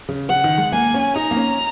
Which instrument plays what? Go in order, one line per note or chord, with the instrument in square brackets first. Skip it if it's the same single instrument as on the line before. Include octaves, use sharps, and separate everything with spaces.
[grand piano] C#3
[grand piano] C#3 [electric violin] F#5
[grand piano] D#3
G#3
[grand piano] A#3 [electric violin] G#5
[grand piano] C#4
[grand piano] D#4 [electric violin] A#5
[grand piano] A#3
C#4